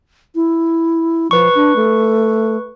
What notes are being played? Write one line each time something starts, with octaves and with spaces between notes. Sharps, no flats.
E4
F3 B4 C#6
D4
A3